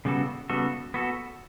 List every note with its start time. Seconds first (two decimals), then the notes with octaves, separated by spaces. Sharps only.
0.05 C#3 G3 B3 F#4 A4
0.50 C#3 G3 B3 F#4 A4
0.94 B3 F#4 A4